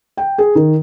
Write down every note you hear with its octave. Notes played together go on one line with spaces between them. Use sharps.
G5
G#4
D#3